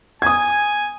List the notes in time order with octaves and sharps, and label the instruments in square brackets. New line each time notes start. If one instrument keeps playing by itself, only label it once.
[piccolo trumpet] G#5 [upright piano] D#6 G#6